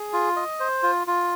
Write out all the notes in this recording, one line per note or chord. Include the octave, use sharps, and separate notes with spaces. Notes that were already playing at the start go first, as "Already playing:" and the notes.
Already playing: G#4
F4
D#5
C5
F4
F4